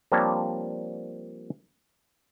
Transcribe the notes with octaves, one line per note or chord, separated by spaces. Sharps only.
F3 G3 A#3 C4 D4 C#5